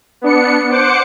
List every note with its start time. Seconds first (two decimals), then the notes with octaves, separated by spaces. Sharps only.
0.21 B3 D4 C#7
0.70 C5 F#5 D6 C#7